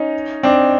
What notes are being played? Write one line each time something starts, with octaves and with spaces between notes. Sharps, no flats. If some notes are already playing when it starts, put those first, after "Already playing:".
Already playing: C#4 D#4
C4 D4